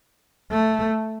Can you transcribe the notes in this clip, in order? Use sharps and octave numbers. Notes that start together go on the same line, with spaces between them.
A3